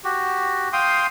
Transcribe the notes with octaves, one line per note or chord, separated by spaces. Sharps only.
F#4 G4
F5 G5 C6 D#6